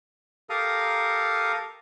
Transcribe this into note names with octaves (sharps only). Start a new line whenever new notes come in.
G4 A4 A#4 F5 A#5 D#6